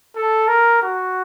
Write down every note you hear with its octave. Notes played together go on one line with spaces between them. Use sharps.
A4
A#4
F#4